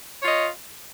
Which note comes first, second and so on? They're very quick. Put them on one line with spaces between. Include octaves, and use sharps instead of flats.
C#5 F4 D#5